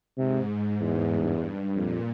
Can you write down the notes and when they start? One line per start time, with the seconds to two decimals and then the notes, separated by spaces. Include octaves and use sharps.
0.17 G#2 C3
0.81 E2 G#2
1.12 G2
1.76 F2 A#2